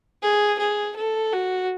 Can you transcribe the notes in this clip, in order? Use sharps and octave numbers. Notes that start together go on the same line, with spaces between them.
G#4
G#4
A4
F#4